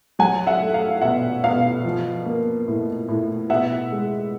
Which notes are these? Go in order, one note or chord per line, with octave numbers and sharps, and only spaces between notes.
F#3 F#5 G#5
E5 F#5
A3
F5
B2 E5 F#5
B2 F5
F3
A#3
A2
A2
B2 E5 F#5
G#3